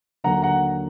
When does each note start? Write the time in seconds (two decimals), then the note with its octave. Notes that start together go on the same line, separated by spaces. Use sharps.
0.24 D#2 D3 F#3 A#3 F#5 A#5
0.42 F#5 A#5